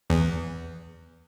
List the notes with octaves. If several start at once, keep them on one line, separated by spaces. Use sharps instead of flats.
E2